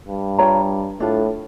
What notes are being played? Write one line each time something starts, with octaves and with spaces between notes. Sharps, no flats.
G2
F4 C#5 G5 A#5
A2 D4 F4 A4